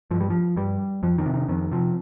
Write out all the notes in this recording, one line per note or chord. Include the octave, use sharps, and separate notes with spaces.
G2 F3
G3
F3
G2 G3
F2 F3
D#3
C3
D#3
F2 D#3
C3 F3